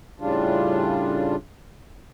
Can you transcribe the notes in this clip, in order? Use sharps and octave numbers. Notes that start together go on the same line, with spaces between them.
A2 C#3 G3 D4 F4